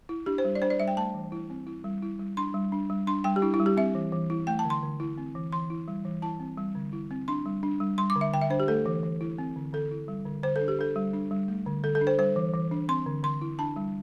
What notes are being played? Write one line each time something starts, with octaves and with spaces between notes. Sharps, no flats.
E4
D4 G4
C5
G3
D5
D4 C5
D5
G3 E5
G5
A3 A5
E3
E4
C4
E4
G3
E4
G3
D4 C6
G3
D4
G3
D4 C6
G3 G5
G4
D4 E4
E4
G3
G4
C4 E5
E3
E3
E4
A3 G5
A5
D3
C6
D3
E4
C4
E3
E3 C6
E4
G3
E3
E4 A5
C4
G3
D3
E4
C4
D4 C6
G3
D4
G3
G3 C6
D6
D3
E5
D3 G5
E5
D4 C5
G4
A3 A4
E3
E3
E4
C4
D3
D3 A4
E4
G3
D3
D3 C5
A4
D4
G4
D4 A4
G3
D4
G3
A3
D3
D3 A4
A4
D4
C5
G3 C5
E3
E3
D4
C4 C6
D3
D3 C6
E4
D4 A5
G3